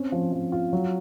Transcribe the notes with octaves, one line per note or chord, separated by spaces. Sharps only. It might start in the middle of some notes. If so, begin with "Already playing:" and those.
Already playing: C4 C#4
F3
F3
F4
F#3